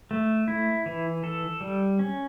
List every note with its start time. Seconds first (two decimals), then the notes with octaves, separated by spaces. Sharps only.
0.11 A3
0.48 E4
0.86 E3
1.24 A4
1.61 G3
1.99 C#4